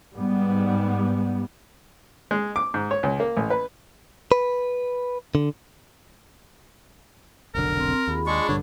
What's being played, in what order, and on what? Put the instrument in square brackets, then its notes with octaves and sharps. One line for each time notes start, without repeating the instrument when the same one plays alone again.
[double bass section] G#2 G3 B3
[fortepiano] G#3
D6
G#2
C#5
C#2
A#3
A1
B4
[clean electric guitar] B4
D3
[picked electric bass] F1 B1 D3 [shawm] A#4
[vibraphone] C4 C6
[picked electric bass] D#2 [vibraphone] F4 G#4 B5
[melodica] G#3 C#6 [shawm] D4
[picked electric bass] A#1 G2 D3 [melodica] C#5